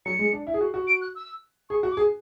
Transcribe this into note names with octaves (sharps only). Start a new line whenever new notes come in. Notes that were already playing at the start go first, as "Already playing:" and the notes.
F#3 C#7
G#3
D4
E4
G#4
F#4
F#4
D7
F#6
E6
G#4 C#6
F#4
D6
G#4